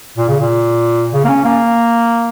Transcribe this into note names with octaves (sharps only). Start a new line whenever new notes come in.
A#2
C#3
A#2
C#3
A#3
C#4
A#3